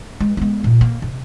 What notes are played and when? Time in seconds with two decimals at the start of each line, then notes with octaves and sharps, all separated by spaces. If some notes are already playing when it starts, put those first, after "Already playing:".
0.21 G#3
0.37 G#3 B3
0.64 A#2
0.81 A#3
1.02 C3